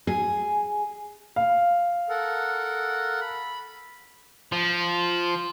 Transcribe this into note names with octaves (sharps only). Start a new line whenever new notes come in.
G#4 G#5
F5
A4 A#4 F#5
B5
F3